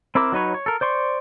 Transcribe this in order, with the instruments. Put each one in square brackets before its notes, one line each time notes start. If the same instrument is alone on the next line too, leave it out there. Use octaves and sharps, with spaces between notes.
[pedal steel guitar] C4 E4 A#4 D6 E6
F#3 D#4 B4 C#5
C#5
A4 A#4
C5 D5 C6 C#6